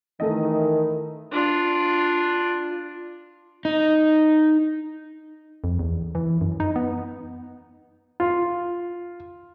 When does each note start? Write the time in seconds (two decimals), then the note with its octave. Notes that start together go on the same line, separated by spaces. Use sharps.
0.20 D#3 E3 A3 D#5
1.32 D4 F4
3.65 D#4
5.64 F2
5.79 E2
6.15 E3
6.41 F#2
6.60 D#4
6.76 B3
8.20 F4